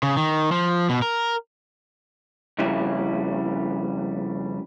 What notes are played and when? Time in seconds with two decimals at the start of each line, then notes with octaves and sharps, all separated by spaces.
0.03 C#3
0.17 D#3
0.51 F3
0.89 B2
1.02 A#4
2.59 F2 C#3 G3 E4